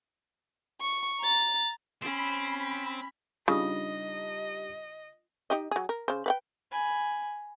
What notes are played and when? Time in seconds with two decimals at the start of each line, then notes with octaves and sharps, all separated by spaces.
0.81 C#6
1.20 A#5 A6
2.02 C4 C#4 B5
3.48 C#3 G3 D4 D#4 F4 D#5 D#6
5.50 D#4 G4 D#5
5.71 F#3 G#4
5.89 A#4
6.08 C#3 C5
6.26 B4 F#5 G5
6.72 G#5 B5